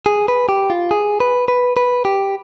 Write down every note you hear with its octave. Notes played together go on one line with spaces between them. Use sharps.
G#4
B4
G4
F4
G#4
B4
B4
B4
G4